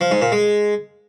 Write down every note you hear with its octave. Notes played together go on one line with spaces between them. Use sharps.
F3
G#2
A#2
G#3